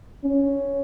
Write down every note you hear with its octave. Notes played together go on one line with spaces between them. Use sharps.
C#4